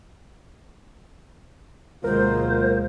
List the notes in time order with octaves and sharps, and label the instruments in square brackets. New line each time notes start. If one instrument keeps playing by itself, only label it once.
[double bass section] D2 B2 G#3 [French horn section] F#3 A#3 F4 [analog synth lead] A#4 [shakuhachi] C5